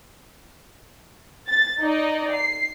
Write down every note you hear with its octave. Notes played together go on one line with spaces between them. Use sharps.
A6
D#4 D5 D#5
C7